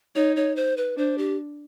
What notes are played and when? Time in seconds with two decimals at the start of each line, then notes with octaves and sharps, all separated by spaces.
0.15 D#4 C#5
0.36 C#5
0.56 C5
0.77 B4
0.97 D4 C5
1.18 G4